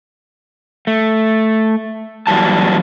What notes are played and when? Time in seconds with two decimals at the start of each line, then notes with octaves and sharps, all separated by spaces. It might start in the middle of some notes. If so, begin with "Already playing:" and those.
0.87 A3
2.27 F#2 A#2 E3 F#3 G3 A5